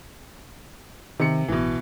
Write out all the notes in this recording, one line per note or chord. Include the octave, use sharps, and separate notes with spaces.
C3 D#3 C#7
A1 B2 E3